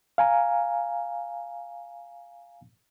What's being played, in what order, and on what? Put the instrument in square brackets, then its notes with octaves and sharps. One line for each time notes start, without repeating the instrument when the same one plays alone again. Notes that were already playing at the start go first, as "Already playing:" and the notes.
[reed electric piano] F5 G#5 A#5